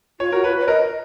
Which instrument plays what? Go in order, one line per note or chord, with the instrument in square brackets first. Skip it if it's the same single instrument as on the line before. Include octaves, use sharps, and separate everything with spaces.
[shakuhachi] F4 [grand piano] C#5
[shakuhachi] F#4 [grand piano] A#4
[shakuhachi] F4 [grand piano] B4
[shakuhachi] C#5
[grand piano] A#4 [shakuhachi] D#5